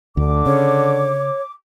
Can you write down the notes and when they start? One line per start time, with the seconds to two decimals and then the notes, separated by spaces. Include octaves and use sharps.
0.17 D2 D3 D6
0.46 C#3 C#5